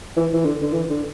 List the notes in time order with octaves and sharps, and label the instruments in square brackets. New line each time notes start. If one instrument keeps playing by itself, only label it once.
[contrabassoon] E3
E3
D3
D3
E3
D3